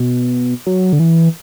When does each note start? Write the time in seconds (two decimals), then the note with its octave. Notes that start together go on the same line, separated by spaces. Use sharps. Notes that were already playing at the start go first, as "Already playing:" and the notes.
Already playing: B2
0.67 F#3
0.93 D3
0.99 E3